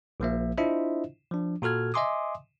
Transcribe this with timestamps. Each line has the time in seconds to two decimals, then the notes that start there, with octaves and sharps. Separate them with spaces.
0.20 A#1 F3 A#3 E5
0.58 D4 E4 F4 C5 D#5 E5
1.31 F3 D4
1.62 A#2 F#4 A4 F6 G#6
1.94 D#5 E5 G#5 C6 D6 D#6